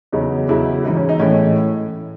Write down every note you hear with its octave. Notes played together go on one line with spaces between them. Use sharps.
E2 C#3 F#3 D#4
E2 C#3 F#3 E4
G#2 E3 G#3 D#4
C#4
D#4
A2 E3 G#3 C#4